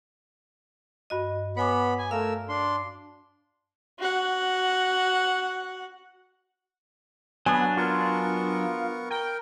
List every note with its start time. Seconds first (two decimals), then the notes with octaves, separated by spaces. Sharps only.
1.10 G2 F#4 D#5
1.57 B3 C#5 G#5 B5 D6
1.98 G#5
2.11 A3 A#4 F5 E6
2.49 D4 C6
3.99 F#4 F#5
7.46 F#3 B3 D4 G#5
7.77 B3 F4 A#4 C#6
9.10 A#4 G5